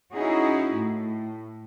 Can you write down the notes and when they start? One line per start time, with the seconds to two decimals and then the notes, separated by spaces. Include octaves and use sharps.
0.12 C#4 D#4 E4 F#4 G#4
0.74 A2